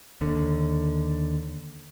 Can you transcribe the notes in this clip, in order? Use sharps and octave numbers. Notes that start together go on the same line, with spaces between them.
D#2 D3